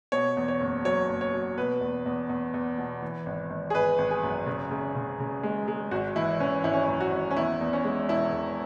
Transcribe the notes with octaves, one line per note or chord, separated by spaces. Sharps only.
B2 C#5
E2
C#5
F#1
F#3 C#5
F#1
C#5
F#3
B2 B4
E2
E2
E2
E2
B2
E3
G#1
G#1
G#4
G#1 B4
G#1
G#4
F#2
C#3
C#3
C#3
C#3
G#3
G#3
G#1 F#4
E3 E4
E3 C#4
G#1 E4
C#4
E4
F#2
F#4
G#1
C#4
E2 E4
E2
C#4
G#3
E1 E4
E1